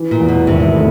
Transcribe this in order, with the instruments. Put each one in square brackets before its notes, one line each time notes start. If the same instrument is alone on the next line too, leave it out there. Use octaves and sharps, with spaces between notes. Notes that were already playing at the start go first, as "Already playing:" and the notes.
Already playing: [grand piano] E3
[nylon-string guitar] A#2
[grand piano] E2
[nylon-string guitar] B2
[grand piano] G#1 [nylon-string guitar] C3
[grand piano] A3